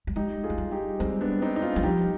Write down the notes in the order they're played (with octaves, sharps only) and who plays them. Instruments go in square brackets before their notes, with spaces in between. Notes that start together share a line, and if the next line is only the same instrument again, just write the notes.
[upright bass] G3
[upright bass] G#3 [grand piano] D#4 G4
[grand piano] F4 G#4
[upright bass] G#3
G3
[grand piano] F4
D#4 G4
[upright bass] G3 [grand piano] G#3 C4
[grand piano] B3 D4
C4 D#4
D#4
D4 F4
[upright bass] G3
[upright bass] F3 [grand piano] D#4 G4